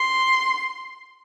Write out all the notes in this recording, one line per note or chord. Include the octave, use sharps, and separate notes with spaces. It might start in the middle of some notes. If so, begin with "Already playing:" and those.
Already playing: C6